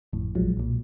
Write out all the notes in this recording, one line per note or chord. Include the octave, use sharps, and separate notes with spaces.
G#1 F2 A2
A#1 F3 F#3 G#3
B1 A#2